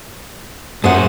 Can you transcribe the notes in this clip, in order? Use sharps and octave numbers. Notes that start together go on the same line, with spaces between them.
F#2 G#4 C5 F#5